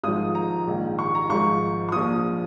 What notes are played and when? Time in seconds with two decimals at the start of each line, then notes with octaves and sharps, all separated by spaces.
0.03 G#1 G#2 F3 D#6
0.35 A#5
0.67 A#1 G#2 D#3
0.99 C#6
1.15 A#5
1.29 G#1 G#2 F3 C#6
1.89 C#6
1.92 A#1 A#2 F3 D#6